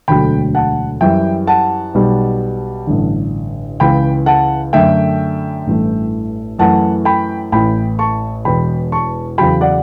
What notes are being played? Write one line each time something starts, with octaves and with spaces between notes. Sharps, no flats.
E1 D2 D3 F#3 A3 G5 B5
F#5 A5
F#2 E3 G3 E5 G5
F#5 A5
B1 B2 G3
A1 G2 D3
C#2 C#3 E3 G5 B5
F#5 A5
F#2 D3 A3 E5 G5
A1 G2 E3 A3
F#2 E3 A3 F#5 A5
G5 B5
A1 A2 E3 G5 B5
A5 C#6
E1 E2 B2 G5 B5
A5 C#6
E2 C#3 F#3 G5 B5
D5 F#5